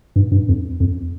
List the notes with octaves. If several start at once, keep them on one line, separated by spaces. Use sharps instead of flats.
G2
G2
F2
F2